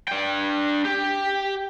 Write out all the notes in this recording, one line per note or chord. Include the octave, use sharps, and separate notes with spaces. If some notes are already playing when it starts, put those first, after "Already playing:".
D4 G5
G4